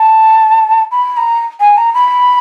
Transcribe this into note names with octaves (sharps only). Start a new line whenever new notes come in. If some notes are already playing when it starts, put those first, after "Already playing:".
Already playing: A5
B5
A#5
G#5
A#5
B5